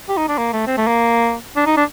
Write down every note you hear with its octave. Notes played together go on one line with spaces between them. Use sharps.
G4
D#4
D4
A#3
A3
C4
A3
A#3
D4
D#4
D4